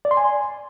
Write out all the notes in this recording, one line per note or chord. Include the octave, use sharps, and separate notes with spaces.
D5
C6
G#5